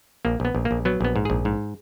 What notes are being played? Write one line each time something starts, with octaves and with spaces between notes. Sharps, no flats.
A#1 A#3
A#1 B3
A#1
A#3
A#1
F#3 B3
A#1 B3
G#2
A#1 G#4
G#2